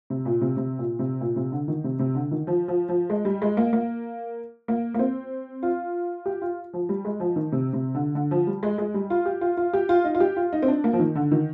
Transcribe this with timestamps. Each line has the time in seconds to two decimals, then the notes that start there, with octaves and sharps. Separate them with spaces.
0.10 C3
0.25 A#2
0.41 C3
0.57 C3
0.78 A#2
0.99 C3
1.21 A#2
1.36 C3
1.52 D3
1.68 D#3
1.84 C3
1.99 C3
2.15 D3
2.31 D#3
2.47 F3
2.68 F3
2.89 F3
3.10 G#3
3.25 G3
3.42 G#3
3.57 A#3
3.73 A#3
4.68 A#3
4.94 A#3
4.99 C4
5.63 F4
6.26 G4
6.42 F4
6.73 F3
6.89 G3
7.05 G#3
7.20 F3
7.36 D#3
7.52 C3
7.73 C3
7.94 D3
8.15 D3
8.31 F3
8.47 G3
8.63 G#3
8.78 G#3
8.94 G3
9.10 F4
9.26 G4
9.41 F4
9.57 F4
9.73 G4
9.89 F4
10.04 D#4
10.15 F4
10.20 G4
10.37 F4
10.53 D#4
10.62 C4
10.68 D4
10.84 A#3
10.93 F3
11.00 D#3
11.15 D3
11.31 D#3